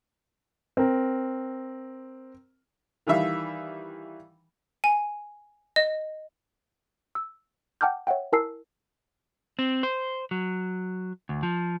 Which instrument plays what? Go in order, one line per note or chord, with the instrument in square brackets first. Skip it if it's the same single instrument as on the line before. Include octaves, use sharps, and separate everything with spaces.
[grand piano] C4 A#4
[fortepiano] D#3 E3 G3 E5 F5
[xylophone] G#5
D#5
[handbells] E6
F#5 G5 A5 D6 F6 G6
C#5 E5 F#5 G5
E4 A#4 G#5 A5 E6 C7
[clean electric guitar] C4
C5
F#3
D2
F3